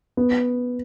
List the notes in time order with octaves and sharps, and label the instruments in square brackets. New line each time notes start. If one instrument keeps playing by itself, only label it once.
[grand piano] B3